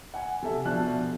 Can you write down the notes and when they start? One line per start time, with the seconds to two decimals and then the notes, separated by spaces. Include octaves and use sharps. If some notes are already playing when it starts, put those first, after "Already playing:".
0.14 F#5 G#5
0.43 C3 A4 E5
0.65 B2 F3 D4 F#6